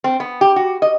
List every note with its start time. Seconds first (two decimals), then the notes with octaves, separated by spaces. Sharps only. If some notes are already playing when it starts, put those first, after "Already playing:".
0.04 C4
0.20 B3
0.41 G4
0.56 F#4
0.82 D#5